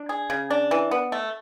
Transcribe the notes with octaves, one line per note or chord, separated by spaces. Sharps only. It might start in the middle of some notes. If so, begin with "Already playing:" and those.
Already playing: D4
G#4
C#3
D4
E3
B3
A3